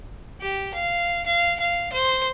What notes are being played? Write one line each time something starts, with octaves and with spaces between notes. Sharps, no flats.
G4
F5
F5
F5
C5